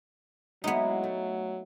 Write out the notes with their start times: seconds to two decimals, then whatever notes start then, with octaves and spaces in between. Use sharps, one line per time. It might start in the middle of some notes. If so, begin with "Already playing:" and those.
0.64 F#3 G#3 A#3 B3 D#4 E4
1.04 A3